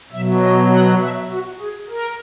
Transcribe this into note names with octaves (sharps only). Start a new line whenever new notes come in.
B2 F#3 E5
D#5
F#5
E5
F#4
G#4
A#4